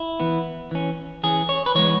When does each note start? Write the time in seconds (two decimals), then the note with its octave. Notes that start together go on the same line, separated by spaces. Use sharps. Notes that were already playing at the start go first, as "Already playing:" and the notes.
Already playing: E4
0.20 E3 B3
0.71 E3 C#4
1.23 E3 C#4 G#4
1.49 C#5
1.66 B4
1.75 E3 G#3 B3 C#5